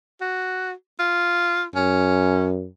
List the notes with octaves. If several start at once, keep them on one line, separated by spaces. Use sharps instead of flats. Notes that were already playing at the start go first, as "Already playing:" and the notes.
F#4
F4
F#2 C#4